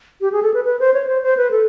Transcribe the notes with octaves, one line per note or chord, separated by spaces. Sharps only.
G4
G#4
A4
B4
B4
C5
C#5
C5
C5
B4
A4